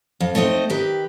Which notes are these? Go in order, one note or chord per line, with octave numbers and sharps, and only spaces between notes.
F2
A3 C4 D#4 C5 D#5
D#3 G4 B4